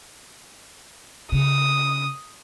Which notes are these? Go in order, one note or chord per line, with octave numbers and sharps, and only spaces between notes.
C#3 D#6